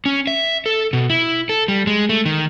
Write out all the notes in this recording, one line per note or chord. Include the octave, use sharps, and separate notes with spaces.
C#4
E5
A4
B2
E4
A4
G3
G#3
A3
D#3